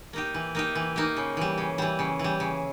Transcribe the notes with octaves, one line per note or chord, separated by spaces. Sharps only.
A#3 D#4 G4
E3
A#3 D#4 G4
E3
A#3 D#4 G4
C#3
E3 G3
C#3
E3 G3
C#3
E3 G3
C#3